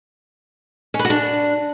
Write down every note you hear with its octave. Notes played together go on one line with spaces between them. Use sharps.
C#4
B4
F#4
D4